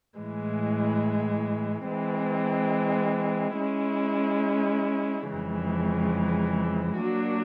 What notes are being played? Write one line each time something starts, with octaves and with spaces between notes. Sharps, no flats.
A2 E3 G#3
E3 G#3 C4
G#3 C#4 E4
F2 C#3 E3 G#3
F#3 A#3 D4 F#4